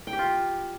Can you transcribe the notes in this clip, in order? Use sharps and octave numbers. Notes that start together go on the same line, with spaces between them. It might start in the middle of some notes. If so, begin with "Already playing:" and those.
G5
G4
F4